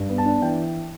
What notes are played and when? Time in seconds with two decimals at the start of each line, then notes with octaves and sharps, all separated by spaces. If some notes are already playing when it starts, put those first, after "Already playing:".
Already playing: G2
0.09 B3
0.18 A5
0.26 D4
0.42 E3 G5